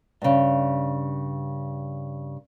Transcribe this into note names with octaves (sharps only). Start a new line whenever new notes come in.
G2 C#3